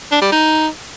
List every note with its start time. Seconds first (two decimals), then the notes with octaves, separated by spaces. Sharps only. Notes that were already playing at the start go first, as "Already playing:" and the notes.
0.11 D4
0.22 G3
0.32 D#4